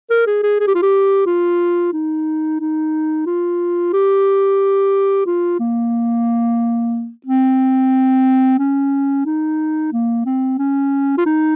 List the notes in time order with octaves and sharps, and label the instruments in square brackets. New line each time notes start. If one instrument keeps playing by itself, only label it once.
[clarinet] A#4
G#4
G#4
G#4
G4
F4
G4
F4
D#4
D#4
F4
G4
F4
A#3
C4
C#4
D#4
A#3
C4
C#4
F4
D#4